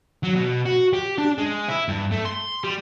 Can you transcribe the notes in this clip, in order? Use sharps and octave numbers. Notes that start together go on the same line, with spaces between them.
F#3
B2
F#4
G4
D4
G#3
E4
G2
A3
C6
G3